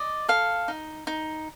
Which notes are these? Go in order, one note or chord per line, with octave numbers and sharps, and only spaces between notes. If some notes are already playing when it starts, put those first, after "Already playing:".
Already playing: D5 D#5
A4 F5
D#4
D#4